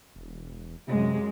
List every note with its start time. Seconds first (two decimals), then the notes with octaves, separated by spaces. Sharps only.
0.15 E1
0.88 F#2 C3 G#3